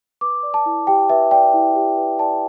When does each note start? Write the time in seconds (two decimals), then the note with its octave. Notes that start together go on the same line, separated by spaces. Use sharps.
0.21 B4 D6
0.43 D5
0.54 A5
0.66 E4
0.87 G4 G5
1.10 B4 E5
1.31 D5 G5
1.54 E4
1.76 G4
1.97 B4
2.19 D5 A5